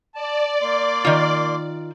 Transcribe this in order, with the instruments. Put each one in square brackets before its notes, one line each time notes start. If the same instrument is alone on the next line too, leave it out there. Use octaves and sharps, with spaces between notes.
[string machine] D5 [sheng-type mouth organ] A5
[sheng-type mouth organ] A#3 C6 D6
[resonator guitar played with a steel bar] D#3 F4